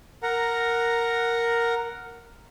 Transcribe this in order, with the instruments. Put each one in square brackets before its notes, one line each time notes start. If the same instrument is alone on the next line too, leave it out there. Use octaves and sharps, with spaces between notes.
[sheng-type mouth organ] A#4 F#5 A#5